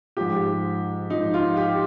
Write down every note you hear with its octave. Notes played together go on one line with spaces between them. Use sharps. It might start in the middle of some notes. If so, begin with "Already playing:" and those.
G#2 F3 G4
G#2 F3 D#4
F4
G4